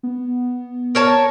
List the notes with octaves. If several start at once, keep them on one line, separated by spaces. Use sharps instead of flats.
B3
A#4 C#5 A5